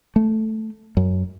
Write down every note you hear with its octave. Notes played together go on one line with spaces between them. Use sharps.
A3
F#2